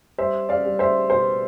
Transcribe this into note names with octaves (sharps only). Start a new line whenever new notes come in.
G3 C5 E5
D5 F5
G3
C5 E5
B2 C5